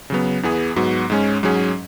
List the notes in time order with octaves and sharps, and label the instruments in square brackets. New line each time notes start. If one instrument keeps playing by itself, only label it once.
[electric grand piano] C#3 F#3 B3
E2 E3 B3 G#4
G#2 F#3 B3 F#4
G#2 G#3 C#4
G#2 F#3 C#4 G#4